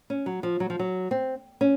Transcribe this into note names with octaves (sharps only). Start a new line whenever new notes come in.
C#4
F#3
F3
F#3
F3
F#3
C4
C#4